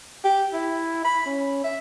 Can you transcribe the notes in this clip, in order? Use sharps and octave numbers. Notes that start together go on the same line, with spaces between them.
G4
E4
B5
C#4
E5